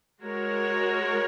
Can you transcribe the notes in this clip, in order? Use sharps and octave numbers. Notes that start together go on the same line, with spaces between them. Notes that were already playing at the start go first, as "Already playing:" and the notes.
G#3 F#4 A#4 C#5